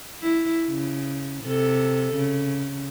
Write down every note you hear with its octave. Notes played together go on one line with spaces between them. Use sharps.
E4
C#3
C3 A4
C#3